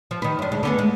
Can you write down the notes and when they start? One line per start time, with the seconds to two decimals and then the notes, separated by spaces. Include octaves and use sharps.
0.11 F3
0.22 D#3 B4
0.39 F#2 D4
0.52 D2 G#3
0.63 D3 B3 C#4
0.79 G#3